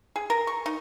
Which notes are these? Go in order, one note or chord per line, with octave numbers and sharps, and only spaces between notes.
G#4
A#4
C#6
D#4